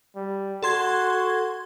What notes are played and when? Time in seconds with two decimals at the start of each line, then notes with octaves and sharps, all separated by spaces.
0.16 G3
0.63 F#4 A4 C6 G#6